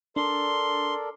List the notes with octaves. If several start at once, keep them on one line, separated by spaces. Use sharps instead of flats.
D4 A4 A#4 D5 C6